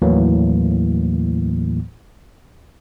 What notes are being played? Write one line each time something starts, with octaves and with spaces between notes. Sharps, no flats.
D#2 A2 E3 F#3 A#3